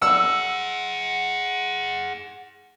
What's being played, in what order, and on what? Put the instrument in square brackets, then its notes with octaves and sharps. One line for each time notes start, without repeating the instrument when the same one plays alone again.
[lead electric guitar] G#4 F#5 [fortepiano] E6